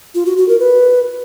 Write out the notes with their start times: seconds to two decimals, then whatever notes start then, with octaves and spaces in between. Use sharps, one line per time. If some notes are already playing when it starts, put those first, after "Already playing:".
0.15 F4
0.26 F#4
0.37 F#4
0.48 A#4
0.60 B4